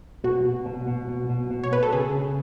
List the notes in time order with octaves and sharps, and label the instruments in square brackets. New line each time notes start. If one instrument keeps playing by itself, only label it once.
[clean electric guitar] B2 [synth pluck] F#4
[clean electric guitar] B2
B2
B2
B2
B2
B2
[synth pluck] C#5
[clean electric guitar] B2 [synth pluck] B4
[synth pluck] A4
[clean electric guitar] C#3 [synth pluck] G#4
[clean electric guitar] C#3